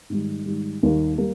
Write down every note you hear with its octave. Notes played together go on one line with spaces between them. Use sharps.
G#2 D#3 G3
G#2 D#3 G3
D#2 D#3 G3 A#3
G3 A#3